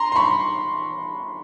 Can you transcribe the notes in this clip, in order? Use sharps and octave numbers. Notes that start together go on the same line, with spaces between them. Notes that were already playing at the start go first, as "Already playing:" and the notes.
Already playing: A#5 C6
C6
B5 C#6